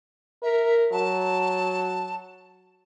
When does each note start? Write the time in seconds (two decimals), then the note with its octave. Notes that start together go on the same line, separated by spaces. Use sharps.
0.43 A#4 E5
0.92 F#3 A5